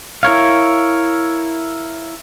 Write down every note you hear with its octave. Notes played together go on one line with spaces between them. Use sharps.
E4 A#4 C#5 F5